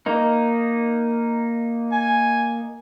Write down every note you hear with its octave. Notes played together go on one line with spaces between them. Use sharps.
A#3 D#4
G#5